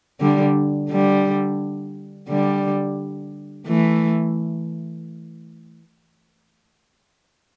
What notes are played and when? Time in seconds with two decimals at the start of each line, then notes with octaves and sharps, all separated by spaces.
0.20 D3 G3
0.90 D3 G3
2.28 D3 G3
3.67 E3 A3